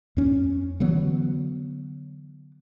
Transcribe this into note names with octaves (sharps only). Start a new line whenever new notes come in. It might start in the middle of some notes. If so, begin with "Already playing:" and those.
F2 C#4
D3 E3 F#3 B3